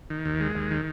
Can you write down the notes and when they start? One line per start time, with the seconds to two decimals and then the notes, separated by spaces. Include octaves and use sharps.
0.10 D#3
0.25 D#2
0.40 G#3
0.55 D#2
0.71 D#3